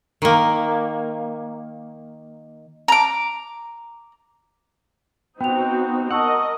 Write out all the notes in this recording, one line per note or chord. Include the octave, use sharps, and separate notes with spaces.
D#3 A#3
A#5 D6
B3 C4 D#4 F#4 G5 F7
A#4 D#5 F#5 A5 C#6 E6